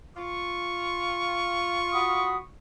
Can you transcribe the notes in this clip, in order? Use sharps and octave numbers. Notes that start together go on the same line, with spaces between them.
F4 C#6
F#4 B5 D#6